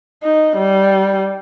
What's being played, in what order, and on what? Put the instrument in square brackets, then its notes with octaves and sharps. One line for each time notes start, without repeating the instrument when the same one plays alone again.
[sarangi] D#4
G3